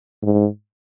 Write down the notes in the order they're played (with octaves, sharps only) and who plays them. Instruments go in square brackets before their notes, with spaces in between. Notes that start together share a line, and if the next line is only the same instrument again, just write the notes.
[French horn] G#2